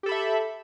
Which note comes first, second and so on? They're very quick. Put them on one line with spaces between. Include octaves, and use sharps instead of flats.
G4 A4 B5 E5